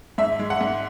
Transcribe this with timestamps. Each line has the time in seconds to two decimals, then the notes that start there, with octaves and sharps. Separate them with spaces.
0.18 G#2 E5
0.39 G#3
0.50 F#5
0.61 G#2